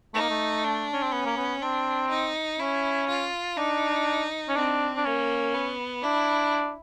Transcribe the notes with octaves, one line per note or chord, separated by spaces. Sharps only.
A3 D#4
A#3
A3
D4
C#4
C4
B3 C#4
A#3
B3
C4 D4
D#4
C#4 E4
F4
D4 D#4
C#4
C4 D4
D4
A#3 C#4
B3
D4 E4